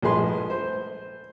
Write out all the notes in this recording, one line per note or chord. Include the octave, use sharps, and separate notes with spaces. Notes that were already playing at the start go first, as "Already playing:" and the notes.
A#1 A2 G#3 G#4 B4 C6
C5